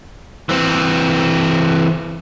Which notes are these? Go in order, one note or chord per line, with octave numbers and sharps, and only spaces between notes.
E3 C4